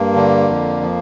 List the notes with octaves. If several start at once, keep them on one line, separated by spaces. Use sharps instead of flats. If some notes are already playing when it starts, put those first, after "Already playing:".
Already playing: G2 A#3
D3
F2
F3